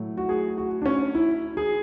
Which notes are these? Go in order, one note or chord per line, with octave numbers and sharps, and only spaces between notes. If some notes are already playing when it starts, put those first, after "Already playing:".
Already playing: A2 F#3 A3
F#4
G#4
F#4
D4
C#4
E4
G#4